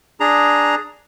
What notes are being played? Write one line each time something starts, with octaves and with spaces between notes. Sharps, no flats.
D4 G#4 A#5